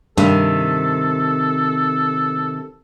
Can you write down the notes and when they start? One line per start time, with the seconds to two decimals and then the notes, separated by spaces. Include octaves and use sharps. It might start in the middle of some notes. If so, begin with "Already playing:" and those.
0.18 G2 C3 D#3 A4